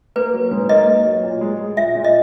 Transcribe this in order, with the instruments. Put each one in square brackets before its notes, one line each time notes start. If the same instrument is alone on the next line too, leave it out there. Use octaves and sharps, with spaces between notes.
[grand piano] A#3 [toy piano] B4
[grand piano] F#3
G#2
[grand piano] A#3 [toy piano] D#5
[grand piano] A#3
F#3
A#2
G#3
G#3
[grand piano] A#2 [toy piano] E5
[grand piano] A#2
[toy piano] D#5